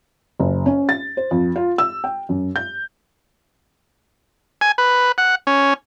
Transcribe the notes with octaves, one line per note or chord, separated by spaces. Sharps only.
F#1
C#4
A6
C5
F2
F4
E6
G5
F#2
G6
G#5
B4
F#5
C#4